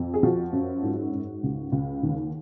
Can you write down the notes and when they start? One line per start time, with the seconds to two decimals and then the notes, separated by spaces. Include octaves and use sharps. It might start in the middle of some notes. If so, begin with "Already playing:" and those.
Already playing: F2
0.14 G#4
0.23 F3 F#4
0.53 F#2
0.83 G#2
1.13 G#2
1.43 C#2
1.72 C#2
2.03 D#2